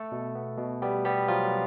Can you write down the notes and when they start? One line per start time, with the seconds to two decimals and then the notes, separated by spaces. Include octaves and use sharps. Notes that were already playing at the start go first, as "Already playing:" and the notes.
Already playing: A3 A4
0.12 B2
0.35 B3
0.58 B2
0.82 G3 B3 G4
1.05 G3 B3 G4
1.28 F3 F#3 F4